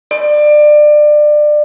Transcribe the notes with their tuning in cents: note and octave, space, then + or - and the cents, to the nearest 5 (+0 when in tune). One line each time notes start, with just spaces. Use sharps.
D5 +25